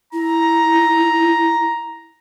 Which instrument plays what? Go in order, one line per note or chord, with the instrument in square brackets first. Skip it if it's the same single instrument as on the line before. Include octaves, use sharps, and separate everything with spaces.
[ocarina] E4 [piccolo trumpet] A#5